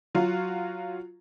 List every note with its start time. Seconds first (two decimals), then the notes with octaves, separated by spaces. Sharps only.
0.15 F#3 F4 F#4